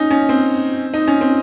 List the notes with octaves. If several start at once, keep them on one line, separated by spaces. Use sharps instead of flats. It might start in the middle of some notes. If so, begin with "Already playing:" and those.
Already playing: C#4 D#4
C#4
C4
D#4
C#4
C4